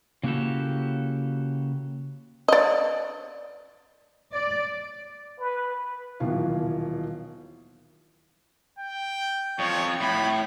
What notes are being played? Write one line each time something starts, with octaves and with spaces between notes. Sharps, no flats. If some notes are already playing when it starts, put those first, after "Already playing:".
C#3 A#3 E4 F#4 G4 A4
D5 D#5
D5
B4
D#1 B2 D#3 E3 F#3 F5
G5
F2 C#5
A2 B5